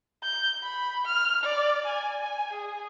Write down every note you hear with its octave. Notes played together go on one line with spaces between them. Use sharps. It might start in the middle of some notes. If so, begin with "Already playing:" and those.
G6
B5
F6
D5
G#5
G#5
G#4